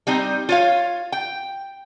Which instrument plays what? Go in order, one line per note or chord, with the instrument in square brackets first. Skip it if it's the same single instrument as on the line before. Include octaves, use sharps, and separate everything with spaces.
[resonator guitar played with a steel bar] G3 C4 D#4
F4 C#5 F5
G5